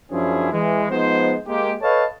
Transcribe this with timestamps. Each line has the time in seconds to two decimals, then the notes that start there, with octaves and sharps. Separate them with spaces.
0.11 F#2 F3 C#4 D4 E4 G#4
0.53 E3 G#3
0.90 F3 G#3 B3 D#4 C5
1.46 G#3 A#3 G4
1.82 A4 B4 C#5 D#5 F5 A5